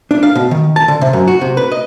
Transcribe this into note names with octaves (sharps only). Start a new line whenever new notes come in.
D4
F5
B2
D#3
A5
D3
C3
F#2
F#4
C3
B4
D#5